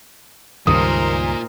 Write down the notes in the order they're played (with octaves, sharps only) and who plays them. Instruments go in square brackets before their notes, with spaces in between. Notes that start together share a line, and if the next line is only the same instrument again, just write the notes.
[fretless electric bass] C#2 G2 D#3 [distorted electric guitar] A#2 [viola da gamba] D#4 A#4 C5 [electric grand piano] D#6